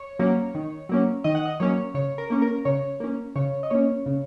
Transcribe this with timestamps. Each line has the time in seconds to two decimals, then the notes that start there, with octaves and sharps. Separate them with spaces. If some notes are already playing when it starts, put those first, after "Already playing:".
Already playing: C#5
0.19 F#3 A#3 C#4
0.55 D#3
0.89 F#3 A#3 C#4
1.24 D#3 D#5
1.35 F#5
1.45 D#5
1.60 F#3 A#3 C#4 C#5
1.94 C#3 C#5
2.18 A#4
2.30 A#3 C#4
2.42 A#4
2.65 C#3 C#5
3.00 A#3 C#4
3.36 C#3 C#5
3.63 D#5
3.70 A#3 C#4 C#5
4.06 C#3